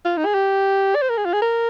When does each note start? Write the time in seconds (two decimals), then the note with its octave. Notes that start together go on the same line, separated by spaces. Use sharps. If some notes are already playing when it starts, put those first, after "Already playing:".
0.05 F4
0.17 D#4
0.26 G#4
0.34 G4
0.95 D5
1.02 C5
1.09 A#4
1.18 G#4
1.25 F4
1.33 G#4
1.42 A#4